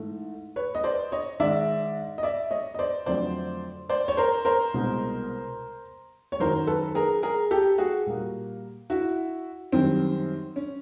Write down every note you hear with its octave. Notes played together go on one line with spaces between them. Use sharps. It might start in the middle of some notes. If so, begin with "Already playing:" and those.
Already playing: G#2 E3 A3
B4 C#5
D#5
C5 D5
C#5 D#5
G#2 D#3 G#3 D5 E5
D#5
D5 E5
C#5 D#5
D#5
C5 D5
F2 D3 F#3 A3 C5 D5
C5 D5
C#5
A#4 C5
A#4 C5
C2 B2 G#3
C#5
F#2 D#3 F#3 A#4 C5
A4 B4
G#4 A#4
G#4 A#4
G4 A4
F#4 G#4
A#2 G3 A#3
E4 F#4
F#2 D#3 G3 C4
C#4